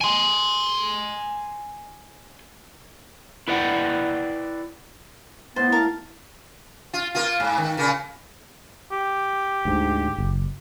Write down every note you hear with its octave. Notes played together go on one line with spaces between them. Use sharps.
G#5 C6
E4 B4 D5 F#5 G5
A2 B3 C5 A6
A#4 F5 A5
F4
A#3 F4
G#2
D#3
A#2 C#3 A#3
G4
D2 G#2
F#1